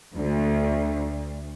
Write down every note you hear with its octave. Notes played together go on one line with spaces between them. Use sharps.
D2